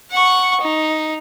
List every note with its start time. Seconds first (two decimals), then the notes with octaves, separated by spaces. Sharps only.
0.11 F#5 C#6
0.61 D#4